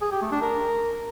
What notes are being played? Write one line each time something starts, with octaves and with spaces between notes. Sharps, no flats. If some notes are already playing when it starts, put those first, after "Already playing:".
G#4
G4
A3
D4
A#4